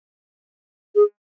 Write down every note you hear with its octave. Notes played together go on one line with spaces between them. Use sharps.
G#4